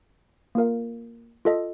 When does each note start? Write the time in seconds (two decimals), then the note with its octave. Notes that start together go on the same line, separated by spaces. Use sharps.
0.55 A#3 F4 A#4 F5
1.45 F4 A4 D#5